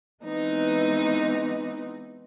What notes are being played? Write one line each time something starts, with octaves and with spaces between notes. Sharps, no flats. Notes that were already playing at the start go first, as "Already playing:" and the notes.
E3 G#3 B3 C4 D#4 B4